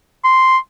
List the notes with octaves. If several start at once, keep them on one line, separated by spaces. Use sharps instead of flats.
C6